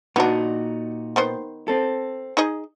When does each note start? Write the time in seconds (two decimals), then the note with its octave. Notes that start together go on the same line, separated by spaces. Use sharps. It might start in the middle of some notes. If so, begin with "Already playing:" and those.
0.16 A#2 B3 D4 D#4 F#4
1.16 D#3 B3 C5
1.68 C4 A4
2.37 D#4 G#4 D#5